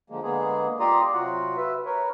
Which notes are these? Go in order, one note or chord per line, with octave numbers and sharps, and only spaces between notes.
D3 F3 G#3 A#3
D3 G#3 A#3 B3 G#4
F4 G4 D5 A#5 C6 D#6
C3 F#3 F4 F#4 F#5
B4 E5
A#4 B4 C#5